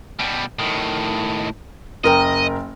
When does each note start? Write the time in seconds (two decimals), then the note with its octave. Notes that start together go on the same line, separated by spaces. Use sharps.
0.19 B2 G3
0.59 A2 D#3
2.04 F#1 A#4 D#5 G5